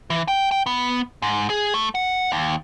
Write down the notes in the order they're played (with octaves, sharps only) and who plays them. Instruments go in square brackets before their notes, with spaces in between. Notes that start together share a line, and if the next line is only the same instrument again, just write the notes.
[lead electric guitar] E3
G5
G5
B3
G#2
G#4
A3
F#5
D#2